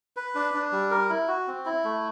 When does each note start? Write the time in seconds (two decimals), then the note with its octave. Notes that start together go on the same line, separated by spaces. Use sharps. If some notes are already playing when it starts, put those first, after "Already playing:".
0.16 B4
0.35 D4
0.54 D4
0.72 G3
0.91 A#4
1.09 E4
1.28 F#4
1.47 C4
1.66 E4
1.84 A3